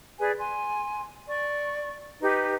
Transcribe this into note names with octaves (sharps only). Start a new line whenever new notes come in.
G#4 B4 D5 G#5
G#5 C6
D5 C#6
D#4 G4 B4